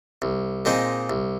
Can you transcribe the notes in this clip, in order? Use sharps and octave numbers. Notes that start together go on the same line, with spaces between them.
C2
A#2 G#3 C4 D#4
C2